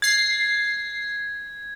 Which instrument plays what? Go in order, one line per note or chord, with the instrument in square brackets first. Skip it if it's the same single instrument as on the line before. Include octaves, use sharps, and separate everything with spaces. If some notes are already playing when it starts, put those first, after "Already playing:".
[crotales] G#6 [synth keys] A6 C7